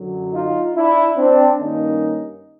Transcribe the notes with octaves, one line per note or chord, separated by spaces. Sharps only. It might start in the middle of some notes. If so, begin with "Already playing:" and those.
Already playing: F#2 D3 F#3
D#4 F4
D4 E4
C4 D4
G2 D#3 G3 A#3 C#4 D#4